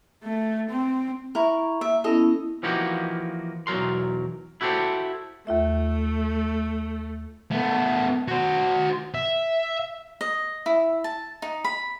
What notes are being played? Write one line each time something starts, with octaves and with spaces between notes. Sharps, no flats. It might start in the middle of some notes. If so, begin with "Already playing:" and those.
A3
C4
E4 A#4 A#5 C#6
A#3 E5
B3 C#4 E4 A4 D#5
E3 F3 A#3 D#4 F#4 G4
B1 E2 F#3 A#4 C6
E4 F#4 G4 A4 C5
D#2 A3 F4 E5
A3 B3
F#4 C5
E5
D#5
E4
A5
D#4
B5